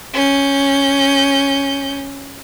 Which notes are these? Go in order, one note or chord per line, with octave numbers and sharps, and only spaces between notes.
C#4 G6